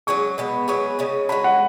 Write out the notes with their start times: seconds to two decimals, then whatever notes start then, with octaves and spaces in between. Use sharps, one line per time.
0.07 F#3 C#4 G#4 C#6
0.38 B2 G#3 B3
0.68 F#3 B3 G#4 C#6
0.99 C#3 G#3 C#4
1.29 G#3 C#4 F#4 B5
1.44 F#5